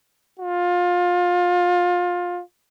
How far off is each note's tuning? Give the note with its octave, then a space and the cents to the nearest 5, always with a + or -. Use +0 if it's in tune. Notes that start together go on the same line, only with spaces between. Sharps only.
F4 +25